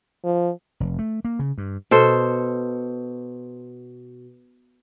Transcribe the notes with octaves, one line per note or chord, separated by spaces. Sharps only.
F3
F1
A3
A#3
C#3
G2
B2 A4 C5